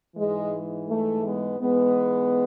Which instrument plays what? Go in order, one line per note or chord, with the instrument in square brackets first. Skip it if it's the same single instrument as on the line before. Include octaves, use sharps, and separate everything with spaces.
[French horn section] G#2 E3 G#3
A3
G#3 B3
G#2 E3 G#3 B3